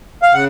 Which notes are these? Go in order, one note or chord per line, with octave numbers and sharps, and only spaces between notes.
F5
C#3 F#5